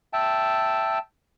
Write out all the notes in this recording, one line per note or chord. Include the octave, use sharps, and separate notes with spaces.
E5 G5 A5